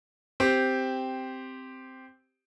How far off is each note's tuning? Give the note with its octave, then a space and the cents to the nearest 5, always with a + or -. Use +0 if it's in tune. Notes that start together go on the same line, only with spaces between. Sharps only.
C4 -5 G4 +0